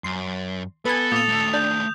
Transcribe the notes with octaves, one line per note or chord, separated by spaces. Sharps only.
F#2 C6
B3 A4 B4 G#5
A#2 D#6 F7
D#2 A3
D4 G6